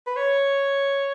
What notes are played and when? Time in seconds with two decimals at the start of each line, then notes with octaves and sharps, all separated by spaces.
0.06 B4
0.16 C#5